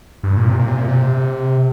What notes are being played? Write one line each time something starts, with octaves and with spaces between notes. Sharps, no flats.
G2
A#2
C3
A#2
C3
A#2
C3